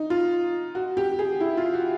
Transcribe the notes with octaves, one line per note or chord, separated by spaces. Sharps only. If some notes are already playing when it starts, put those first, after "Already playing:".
Already playing: D#4
F4
F#4
G4
G#4
E4
F4
F#4